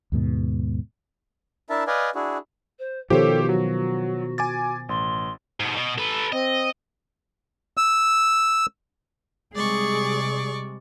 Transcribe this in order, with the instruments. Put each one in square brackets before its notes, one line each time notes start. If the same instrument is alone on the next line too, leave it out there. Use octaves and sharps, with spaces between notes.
[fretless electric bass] D#2 G#2 B2
[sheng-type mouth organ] D4 E4 A#4 E5 A5
B4 D5 D#5 F5 G#5
D4 E4 F#4 G#4
[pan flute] C5
[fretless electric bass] B2 D#3 F3 [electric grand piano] G4 C5 C#5 [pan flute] A4
[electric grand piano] F#3 [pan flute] F#4
[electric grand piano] G#5 D6 A6
[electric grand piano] A1 [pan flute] C6
[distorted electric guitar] G#2 B2
B2
A4 B4
[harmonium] C4 [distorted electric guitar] D#5
[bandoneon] E6
[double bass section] C3 G3 G#3 [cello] G#4 [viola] D5 C#6